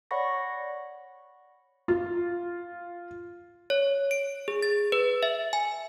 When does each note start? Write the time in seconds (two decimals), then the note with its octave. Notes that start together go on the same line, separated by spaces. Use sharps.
0.11 C#5 D5 F#5 B5 C#6 A#6
1.88 F4
3.70 C#5
4.11 D7
4.48 G#4
4.62 A6
4.92 B4
5.23 E5
5.53 G#5